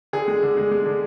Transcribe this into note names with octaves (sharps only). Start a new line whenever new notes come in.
D3 G#4
G#3
D3
G#3
G#3
D3